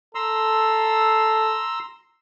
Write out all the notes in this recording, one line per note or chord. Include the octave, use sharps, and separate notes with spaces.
A4 A#5 C6 E6